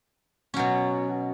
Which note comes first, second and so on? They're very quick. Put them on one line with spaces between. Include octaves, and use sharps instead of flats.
C#4 F#3 B2